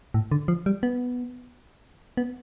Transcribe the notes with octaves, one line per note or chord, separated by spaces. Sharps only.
A2
D3
F3
G3
B3
B3